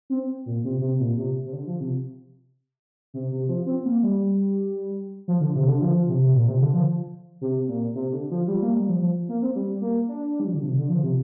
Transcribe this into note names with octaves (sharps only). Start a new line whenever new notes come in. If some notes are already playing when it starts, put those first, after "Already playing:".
C4
A#2
C3
C3
A#2
C3
C3
D3
F3
C3
C3
C3
F3
C4
A#3
G3
F3
D3
C3
D3
F3
C3
A#2
C3
D3
F3
C3
A#2
C3
D3
F3
G3
A#3
G3
F3
F3
A#3
C4
G3
A#3
D4
G3
F3
D3
C3
D3
F3
C3